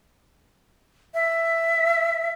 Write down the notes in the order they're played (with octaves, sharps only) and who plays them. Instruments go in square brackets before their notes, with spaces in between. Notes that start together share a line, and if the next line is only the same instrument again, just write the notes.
[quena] E5